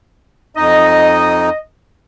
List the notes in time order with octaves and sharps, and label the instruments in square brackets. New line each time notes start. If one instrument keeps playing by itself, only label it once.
[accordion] F2 D#4 [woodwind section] D#5